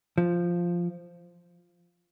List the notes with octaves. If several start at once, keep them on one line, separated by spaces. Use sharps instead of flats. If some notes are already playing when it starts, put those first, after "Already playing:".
F3